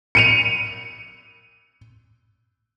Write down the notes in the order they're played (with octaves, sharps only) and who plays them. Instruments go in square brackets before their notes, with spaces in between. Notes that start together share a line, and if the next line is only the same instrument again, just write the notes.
[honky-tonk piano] C#7 D#7 F7